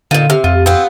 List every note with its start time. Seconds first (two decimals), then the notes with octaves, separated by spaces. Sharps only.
0.11 A#2 D3 D#3 F4
0.30 C3 F6
0.44 F2 F4
0.66 B3 C4 F4